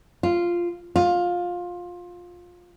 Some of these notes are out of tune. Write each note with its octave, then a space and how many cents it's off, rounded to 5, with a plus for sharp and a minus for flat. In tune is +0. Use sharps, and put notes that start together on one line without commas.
F4 -5
F4 +15